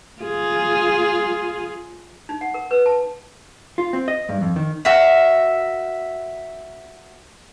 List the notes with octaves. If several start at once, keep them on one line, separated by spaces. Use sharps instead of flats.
F4 G#4
D#4
F#5
A#4
B4
A5
F4
C4
D#5
G2
F2
D#3
F#4 A#4 E5